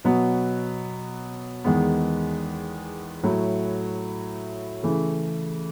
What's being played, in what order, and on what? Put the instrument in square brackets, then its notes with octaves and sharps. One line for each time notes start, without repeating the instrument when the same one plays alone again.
[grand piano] B2 F#3 B3
E2 D#3 G#3 B3
A2 F#3 A3 E4
C#3 E3 A3